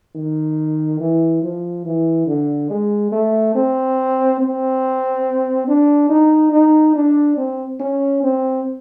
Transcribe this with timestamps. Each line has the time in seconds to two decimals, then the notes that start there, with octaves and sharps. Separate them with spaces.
0.15 D#3
1.00 E3
1.43 F3
1.85 E3
2.27 D3
2.70 G#3
3.12 A3
3.55 C4
4.40 C4
5.68 D4
6.09 D#4
6.52 D#4
6.95 D4
7.37 C4
7.80 C#4
8.23 C4